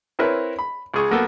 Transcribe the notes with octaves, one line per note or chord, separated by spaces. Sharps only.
C4 E4 A#4 B4 C#5
B5
C#2 G#4 C#6
F#3 A#3 B3 A4